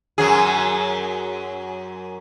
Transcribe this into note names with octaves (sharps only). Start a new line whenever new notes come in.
F#2 F#3 G#4